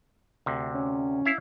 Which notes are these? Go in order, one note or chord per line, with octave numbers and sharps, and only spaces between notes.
D2 C3
C#4
E4 E5 F5